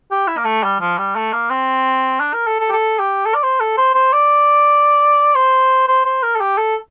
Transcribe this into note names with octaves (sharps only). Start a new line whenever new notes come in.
G4
E4
A#3
A3
G3
F3
G3
A3
A#3
C4
D4
A#4
A4
A4
G4
A4
G4
A4
D5
C5
A4
C5
C5
D5
C5
C5
C5
A#4
A4
G4
A4